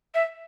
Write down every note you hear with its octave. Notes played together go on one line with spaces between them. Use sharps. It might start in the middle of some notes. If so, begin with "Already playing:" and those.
E5